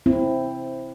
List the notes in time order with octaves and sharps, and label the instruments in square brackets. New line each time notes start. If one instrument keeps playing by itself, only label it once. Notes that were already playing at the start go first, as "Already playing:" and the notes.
[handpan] C4 E4